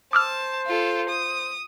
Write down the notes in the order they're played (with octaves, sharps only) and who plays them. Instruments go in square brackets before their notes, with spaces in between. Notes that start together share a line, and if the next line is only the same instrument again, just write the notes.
[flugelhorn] C5 [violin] A5 [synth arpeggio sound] D6 E6 F6
[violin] F4 A4
D#6